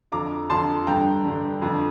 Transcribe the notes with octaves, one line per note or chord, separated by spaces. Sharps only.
F2 D3 A#5 D6
F2 D3 A5 C6
G2 D3 G5 A#5
G2 D3
F2 D3